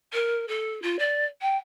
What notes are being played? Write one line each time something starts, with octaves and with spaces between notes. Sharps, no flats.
A#4
A4
F4
D5
G5